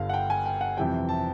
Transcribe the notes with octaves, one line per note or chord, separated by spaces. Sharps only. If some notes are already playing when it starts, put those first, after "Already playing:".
Already playing: G1 G2 D3 G3 F5
F#5
G5
G#5
G5
F#5
F2 C3 E3 G3 G5
A5